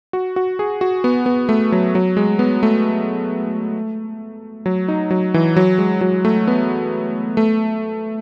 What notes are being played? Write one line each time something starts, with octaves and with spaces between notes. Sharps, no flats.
F#4
F#4
G#4
F#4
B3
B3
A3
F#3
F#3
G#3
B3
A3
F#3
D#4
F#3
E3
F#3
G#3
F#3
A3
B3
A3